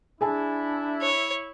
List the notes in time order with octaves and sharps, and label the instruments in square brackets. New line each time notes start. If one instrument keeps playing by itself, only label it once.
[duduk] D4 [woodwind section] E4 [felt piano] G#4 G#5 A5
[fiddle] C#5